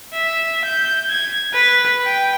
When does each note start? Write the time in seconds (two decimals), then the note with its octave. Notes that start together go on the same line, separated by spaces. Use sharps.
0.14 E5
0.65 G6
1.10 G#6
1.54 B4
2.05 G5